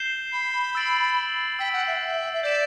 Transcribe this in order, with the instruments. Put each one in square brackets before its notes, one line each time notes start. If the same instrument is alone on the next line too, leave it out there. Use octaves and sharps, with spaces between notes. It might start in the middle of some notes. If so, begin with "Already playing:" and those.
Already playing: [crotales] G6 C7 E7 G7
[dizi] B5
[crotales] E6 A6 D7 F#7
[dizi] G5 [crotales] E6 B6 D7
[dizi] F#5
E5
F#5
E5
E5
[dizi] D5 [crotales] G6 B6 E7